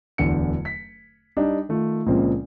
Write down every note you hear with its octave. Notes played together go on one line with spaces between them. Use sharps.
D1 E2 D3 C#7
B6
G3 D4 D#4
D#3 A3 F4
C#2 A#2 C#3 F3 G#3 C4